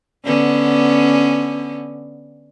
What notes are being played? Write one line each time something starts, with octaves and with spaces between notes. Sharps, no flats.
D3 B3 C#4